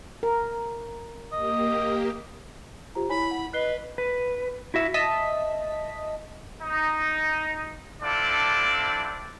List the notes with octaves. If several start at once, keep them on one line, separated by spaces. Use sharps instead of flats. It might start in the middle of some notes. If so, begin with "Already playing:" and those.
A#4
A#3 G4 D#5
F4 G4 C5 A#5
E4 C#5 G#5 B5
F#5
B4 D#5 F#6 C7 G7
B4
E4 F#4 E5
D#5 E5 A5 B6
D#4
C4 D4 E4 F4 A4 D5